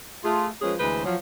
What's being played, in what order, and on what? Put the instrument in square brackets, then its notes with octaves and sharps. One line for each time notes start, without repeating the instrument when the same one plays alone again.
[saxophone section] A3 F4 G#4
F3 G#3 A#3 C#4 G#4 B4
D2 E3 G#3 B4 C5
F3 F#3